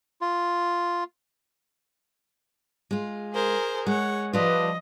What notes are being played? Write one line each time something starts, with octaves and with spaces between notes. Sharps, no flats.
F4
G#3 F4
G#4 A#4 C5
G#3 C#5 F#5
F3 G3 D4 F4 B4 D#5